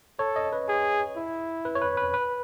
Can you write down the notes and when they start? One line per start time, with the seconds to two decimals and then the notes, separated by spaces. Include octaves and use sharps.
0.19 A4 C#5
0.36 D#5
0.53 B4
0.68 G#4
1.16 E4
1.65 B4
1.75 C#5
1.82 B4
1.97 B4
2.14 B4